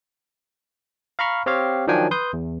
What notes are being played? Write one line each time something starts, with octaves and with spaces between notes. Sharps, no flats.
F5 A#5 B5 C#6 F6
C4 G4 C#5 F5
D#3 F3 F#3 D4 G5 G#5
B4 C6 D#6 G6
E2